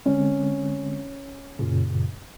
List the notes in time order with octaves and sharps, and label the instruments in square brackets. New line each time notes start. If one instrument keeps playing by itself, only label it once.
[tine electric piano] D3 G#3 C4 [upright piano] C#4
[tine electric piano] F#2 A#2 C#3